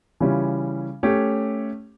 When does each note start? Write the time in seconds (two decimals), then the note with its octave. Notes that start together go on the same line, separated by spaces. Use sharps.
0.20 C#3 E3 G3 C#4 F4
1.03 A3 C#4 G4 C#5